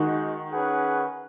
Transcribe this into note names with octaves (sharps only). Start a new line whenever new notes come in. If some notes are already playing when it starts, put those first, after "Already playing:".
Already playing: D#3 G#3 D#4 F#4
C#4 G#4 B4 F#5